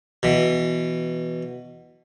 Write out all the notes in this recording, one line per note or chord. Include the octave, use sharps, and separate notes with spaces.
B2 E3